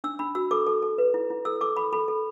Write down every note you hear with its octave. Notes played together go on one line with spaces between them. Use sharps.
D4 E6
D4 B5
F#4 E6
A4 D6
A4
A4
B4
E4
E4
A4 E6
A4 D6
A4 B5
A4 B5
A4